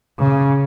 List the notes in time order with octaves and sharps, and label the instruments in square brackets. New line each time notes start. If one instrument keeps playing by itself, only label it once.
[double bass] C#3